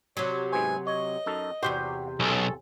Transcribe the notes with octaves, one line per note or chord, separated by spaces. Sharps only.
C3 F#3 C#5
G#2 B3 C5 G#5
C#5 D#5
F#2 D#4 A4
E2 C3 F#4 G4 C5
B1 C#4 G#4 A4